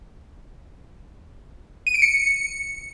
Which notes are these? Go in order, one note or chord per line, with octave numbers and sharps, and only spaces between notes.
D#7
D7
C#7